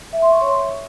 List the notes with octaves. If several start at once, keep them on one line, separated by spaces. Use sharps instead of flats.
E5
C6
C#6
C#5